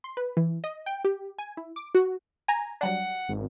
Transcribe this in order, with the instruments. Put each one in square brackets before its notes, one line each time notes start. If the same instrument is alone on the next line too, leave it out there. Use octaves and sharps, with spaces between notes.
[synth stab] C6
B4
E3
D#5
G5
G4
G#5
E4
D6
F#4
G#5 A#5
[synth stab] F#3 G3 D4 [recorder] F#5
[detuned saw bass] G#1